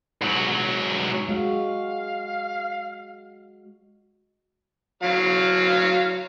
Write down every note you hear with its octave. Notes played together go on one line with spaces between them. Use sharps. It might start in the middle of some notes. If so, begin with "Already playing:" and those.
G#2 F#3
G#3 F#4 F5
F#3 F5